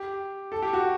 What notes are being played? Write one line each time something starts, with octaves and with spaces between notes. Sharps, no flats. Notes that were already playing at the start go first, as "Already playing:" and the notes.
Already playing: G4
A4
G4
F#4